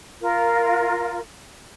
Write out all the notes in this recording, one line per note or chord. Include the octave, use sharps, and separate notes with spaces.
F4 A#4